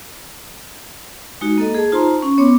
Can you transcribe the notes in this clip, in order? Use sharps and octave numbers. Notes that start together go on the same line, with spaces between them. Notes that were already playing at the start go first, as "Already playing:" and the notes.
G#3 D#4 F#4
A#3 A4 D#5
G#4 A5
D#4 F4 C5 A5 A#5 C6
C#4
B3 C#5 C6 D6